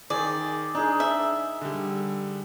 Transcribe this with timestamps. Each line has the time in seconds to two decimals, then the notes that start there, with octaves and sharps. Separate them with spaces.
0.10 D#3 G#4 D5
0.75 D4 D#4 G#4
1.00 E5
1.61 D3 G3